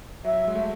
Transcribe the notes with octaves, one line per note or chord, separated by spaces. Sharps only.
F#3 E5
G#3
A3